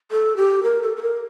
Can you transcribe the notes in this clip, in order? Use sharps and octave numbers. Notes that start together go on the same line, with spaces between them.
A4
G4
A#4
A4
A4
A#4